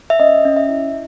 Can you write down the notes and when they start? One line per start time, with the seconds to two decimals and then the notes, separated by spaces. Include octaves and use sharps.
0.10 E5
0.20 C#4 D#5
0.45 C#4
0.56 E5
0.69 E4